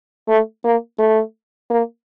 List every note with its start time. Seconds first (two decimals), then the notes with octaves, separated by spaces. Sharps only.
0.28 A3
0.64 A#3
0.99 A3
1.70 A#3